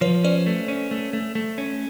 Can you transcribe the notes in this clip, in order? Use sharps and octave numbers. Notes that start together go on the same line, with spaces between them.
F3 B4 C#5
C#4 C5 D5
A3
C#4
A3
A3
A3
C#4